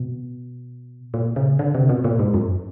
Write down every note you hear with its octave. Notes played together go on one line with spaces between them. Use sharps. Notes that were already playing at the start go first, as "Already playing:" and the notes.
Already playing: B2
A#2
C#3
D3
C3
B2
A#2
G#2
F#2